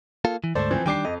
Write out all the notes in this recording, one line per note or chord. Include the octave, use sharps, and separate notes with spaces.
A#3 F4 A4
E3
D2 G#2 A3 A4 C5 D5
E3 F3 C4
D#3 G3 D4 G5 D6 C7
F2 D#5